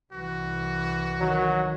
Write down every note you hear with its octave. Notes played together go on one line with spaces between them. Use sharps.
C2 E3 F#4
D#3 F#3